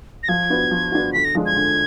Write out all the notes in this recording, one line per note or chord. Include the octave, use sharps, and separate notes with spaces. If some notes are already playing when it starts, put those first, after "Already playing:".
A#6
F3 G#6
B3 D4 F#4
F3
B3 D4 F#4
D3 B6
A#6
F3 G#3 D4
G#6
D3